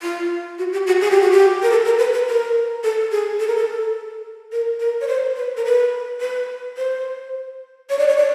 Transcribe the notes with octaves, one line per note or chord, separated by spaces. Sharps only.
F4
F#4
G4
F#4
G#4
G4
F#4
G4
A#4
A4
A#4
B4
B4
A#4
A4
G#4
A4
A#4
A4
A#4
A#4
C#5
C5
B4
A#4
B4
B4
C5
C#5
D5
C#5
D5